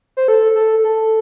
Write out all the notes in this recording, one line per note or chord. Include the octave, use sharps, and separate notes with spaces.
C5
A4
A4
A4